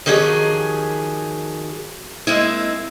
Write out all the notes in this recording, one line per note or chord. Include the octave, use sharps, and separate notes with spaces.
D#3 F3 F#3 G4 G#4
G#3 A#3 C4 E4